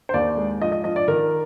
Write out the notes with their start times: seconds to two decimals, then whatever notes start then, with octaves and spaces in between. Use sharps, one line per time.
0.09 C5
0.14 D#2 D5
0.37 G#3
0.62 F3 D#5
0.72 D#5
0.84 F3 D#5
0.96 D5
1.08 D#3 A#4